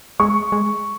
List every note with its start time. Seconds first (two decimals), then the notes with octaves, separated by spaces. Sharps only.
0.20 G#3 C#6
0.52 G#3